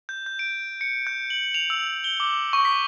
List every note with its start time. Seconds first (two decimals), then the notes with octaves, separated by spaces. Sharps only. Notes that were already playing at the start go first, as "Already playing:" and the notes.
0.09 G6
0.26 G6
0.39 D7
0.81 C#7
1.07 G6
1.30 F#7
1.55 F7
1.70 E6
2.04 G7
2.20 D6
2.53 C#6
2.65 B6